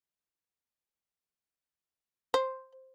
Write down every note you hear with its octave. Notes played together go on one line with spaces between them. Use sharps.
C5